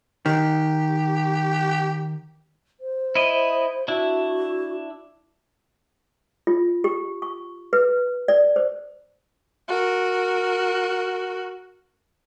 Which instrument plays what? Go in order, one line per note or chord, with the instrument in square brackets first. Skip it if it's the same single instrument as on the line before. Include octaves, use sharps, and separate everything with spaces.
[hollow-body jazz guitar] D#3 [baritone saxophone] G4
[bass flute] C5
[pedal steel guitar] E4 D#5
[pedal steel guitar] D4 E4 [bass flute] F#4
[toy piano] F4
G4
C#6
B4
D5
C5
[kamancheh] F#4 A#4